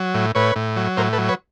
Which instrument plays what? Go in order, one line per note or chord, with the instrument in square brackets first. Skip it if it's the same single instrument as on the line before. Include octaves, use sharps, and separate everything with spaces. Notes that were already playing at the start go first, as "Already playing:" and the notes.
Already playing: [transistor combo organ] F#3
A2
A2 B4 C#5
A2
F#3
A2 A#4 C5
A4 B4
F#3
B4 C#5